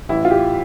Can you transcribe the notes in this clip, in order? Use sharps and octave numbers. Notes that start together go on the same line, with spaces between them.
A1 E4
F4
G4